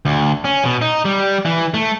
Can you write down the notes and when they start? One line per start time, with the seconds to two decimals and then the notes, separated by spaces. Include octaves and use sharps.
0.05 D2
0.45 C#4
0.65 B2
0.82 D#4
1.05 G3
1.45 E3
1.74 A3